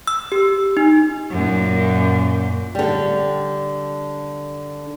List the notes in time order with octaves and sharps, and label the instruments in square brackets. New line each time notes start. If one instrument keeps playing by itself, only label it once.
[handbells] E6
G4
D#4
[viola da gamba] F#2 A#2
[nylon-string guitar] D3 G3